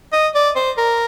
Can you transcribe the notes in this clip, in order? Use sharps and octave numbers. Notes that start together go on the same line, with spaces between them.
D#5
D5
C5
A#4